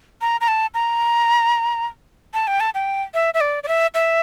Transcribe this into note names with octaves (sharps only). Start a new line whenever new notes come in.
A#5
A#5
A5
A#5
A5
G5
A5
G5
E5
E5
D5
D5
E5
E5